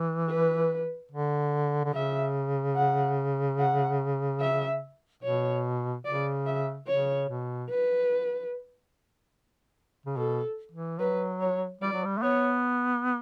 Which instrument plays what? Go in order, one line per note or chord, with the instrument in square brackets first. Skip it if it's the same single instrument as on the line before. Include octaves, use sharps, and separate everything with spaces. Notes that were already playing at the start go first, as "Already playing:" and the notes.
Already playing: [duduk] E3
[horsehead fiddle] B4
[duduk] D3
D3
[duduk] C#3 [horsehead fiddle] E5
[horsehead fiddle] F#5
F#5
E5
[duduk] B2 [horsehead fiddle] C#5
[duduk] C#3 [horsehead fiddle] D5
[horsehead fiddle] E5
[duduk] C#3 [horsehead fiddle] C#5
[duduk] B2
[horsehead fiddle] B4
[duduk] C#3
[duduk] B2 [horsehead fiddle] A4
[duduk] E3
[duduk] F#3 [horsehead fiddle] B4
[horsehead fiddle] C#5
[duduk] G3 [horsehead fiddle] D5
[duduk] F#3
G3
A3
[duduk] B3 [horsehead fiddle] C#5